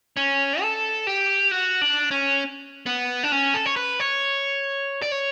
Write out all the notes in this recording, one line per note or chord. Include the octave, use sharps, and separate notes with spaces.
C#4
A4
G4
F#4
D4
C#4
B3
D4
C#4
A4
C#5
B4
C#5
D5
C#5